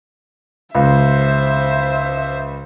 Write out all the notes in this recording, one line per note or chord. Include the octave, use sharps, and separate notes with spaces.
C#2 C5 E5